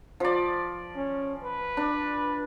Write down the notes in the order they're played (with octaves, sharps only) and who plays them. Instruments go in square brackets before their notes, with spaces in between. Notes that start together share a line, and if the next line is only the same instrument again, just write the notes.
[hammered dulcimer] F3 D5
[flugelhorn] C#4
B4
[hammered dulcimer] D4